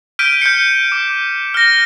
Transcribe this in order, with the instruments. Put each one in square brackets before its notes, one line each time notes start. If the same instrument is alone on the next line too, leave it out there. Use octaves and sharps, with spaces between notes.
[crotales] F6 G6 B6 D7 D#7
G6 C#7
D6
F6 A#6